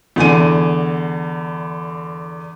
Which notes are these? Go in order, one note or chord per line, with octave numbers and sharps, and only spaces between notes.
E2 D3 G#5 D#7